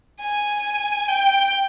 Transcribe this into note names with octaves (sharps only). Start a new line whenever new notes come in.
G#5
G5